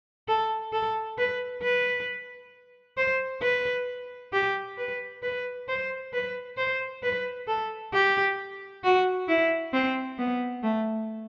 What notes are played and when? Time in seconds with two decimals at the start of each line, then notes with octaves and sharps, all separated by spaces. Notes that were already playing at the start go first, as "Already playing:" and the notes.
0.28 A4
0.73 A4
1.18 B4
1.63 B4
2.97 C5
3.42 B4
4.33 G4
4.78 B4
5.23 B4
5.69 C5
6.13 B4
6.58 C5
7.03 B4
7.48 A4
7.94 G4
8.84 F#4
9.28 E4
9.73 C4
10.19 B3
10.63 A3